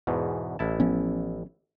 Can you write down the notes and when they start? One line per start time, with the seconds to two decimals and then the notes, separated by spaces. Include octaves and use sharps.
0.07 E2 G#2 B2
0.59 A1 E4 A5
0.80 F3 B3 C#4